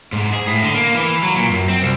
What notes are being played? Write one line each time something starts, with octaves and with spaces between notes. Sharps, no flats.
G#2
G#4
A2
D3
A#3
E3
F#3
A#2
F#2
C4
C2